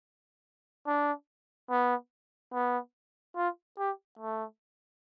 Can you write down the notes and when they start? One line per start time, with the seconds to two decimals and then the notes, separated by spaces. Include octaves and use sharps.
0.87 D4
1.70 B3
2.53 B3
3.36 F4
3.78 G4
4.19 A3